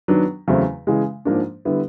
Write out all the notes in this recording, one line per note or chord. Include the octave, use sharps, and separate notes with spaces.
D#3 F#3 B3 D4
E2 C#3 F#3 A3 C4
C#3 E3 G#3
G#2 F3 A#3 D4
D3 G3 B3 E4